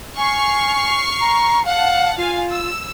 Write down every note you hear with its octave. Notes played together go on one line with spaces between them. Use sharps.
G#5 C#6 F6 C7
A#5
F5 F#5 A5
F4 F5 G#5
E6